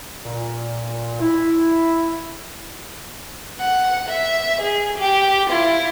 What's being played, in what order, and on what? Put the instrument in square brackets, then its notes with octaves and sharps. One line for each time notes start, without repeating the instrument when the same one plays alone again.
[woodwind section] A#2
E4
[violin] F#5
E5
G#4
G4
E4 F4